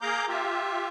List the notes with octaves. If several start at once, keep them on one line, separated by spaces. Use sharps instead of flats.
A#3 G#4 F5 A#5 D6 G6
F4 G4 E5